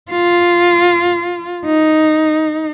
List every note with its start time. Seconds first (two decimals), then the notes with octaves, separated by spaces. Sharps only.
0.11 F4
1.66 D#4